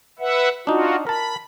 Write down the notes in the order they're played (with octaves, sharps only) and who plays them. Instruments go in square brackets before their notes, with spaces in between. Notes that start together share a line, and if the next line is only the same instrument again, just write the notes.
[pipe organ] B4 E5 F#5
[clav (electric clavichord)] D4 D#4 [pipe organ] F4 F#4
[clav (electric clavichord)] A#4 A5 [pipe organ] B5